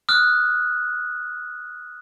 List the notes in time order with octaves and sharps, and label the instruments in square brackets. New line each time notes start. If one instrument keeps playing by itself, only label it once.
[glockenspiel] D#6 F6 F#6